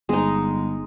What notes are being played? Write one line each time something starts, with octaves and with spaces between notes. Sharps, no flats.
G1 G#3 D#4